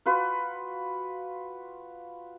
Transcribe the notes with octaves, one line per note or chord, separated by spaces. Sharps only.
F4 F#4 B4